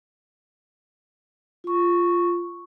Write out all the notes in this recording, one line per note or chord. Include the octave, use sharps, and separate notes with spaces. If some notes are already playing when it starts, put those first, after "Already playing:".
F4 C#6